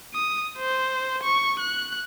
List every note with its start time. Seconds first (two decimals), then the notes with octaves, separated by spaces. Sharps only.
0.14 D#6
0.58 C5
1.23 C#6
1.59 F#6